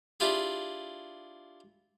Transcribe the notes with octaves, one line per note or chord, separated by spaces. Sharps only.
D4 E4 F4 G4 G#4